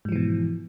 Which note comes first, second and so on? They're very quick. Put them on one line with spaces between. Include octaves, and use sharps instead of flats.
G#2 F3 E3 B2